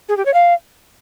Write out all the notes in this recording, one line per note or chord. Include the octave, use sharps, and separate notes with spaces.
G#4
G4
C#5
F5